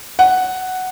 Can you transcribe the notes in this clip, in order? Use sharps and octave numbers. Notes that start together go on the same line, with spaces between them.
F#5